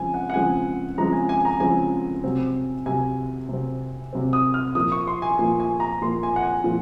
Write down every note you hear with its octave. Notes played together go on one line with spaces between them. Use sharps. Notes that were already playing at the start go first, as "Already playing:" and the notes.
Already playing: C#3 F3 G#3 C4 G#5
F#5
F#5
C#3 F3 G#3 C4 G#5
C#3 F3 G#3 C4 A#5
G#5
G#5
A#5
C#3 F3 G#3 C4 G#5
C3 F#3 C4
C3 F#3 C4 G#5
C3 F#3 C4
C3 F#3 C4
D#6
F6
A#2 F3 A#3 D#6
C#6
C6
G#5
A#2 F3 A#3 G#5
G#5
A#5
A#2 F3 A#3 C6
G#5
F#5
G#5
A#2 F3